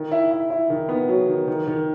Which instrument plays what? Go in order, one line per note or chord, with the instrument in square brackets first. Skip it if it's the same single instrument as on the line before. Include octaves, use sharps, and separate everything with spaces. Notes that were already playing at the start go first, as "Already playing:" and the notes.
Already playing: [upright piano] D#3
E4
E4
E4
D#3
B3
F#3
D#3
D#3
D#3